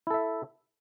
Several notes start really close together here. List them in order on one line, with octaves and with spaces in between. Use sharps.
E4 A4 E5